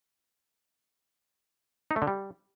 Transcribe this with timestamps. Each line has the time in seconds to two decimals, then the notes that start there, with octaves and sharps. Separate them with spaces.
1.91 D#4
1.96 A3
2.02 D3
2.07 G3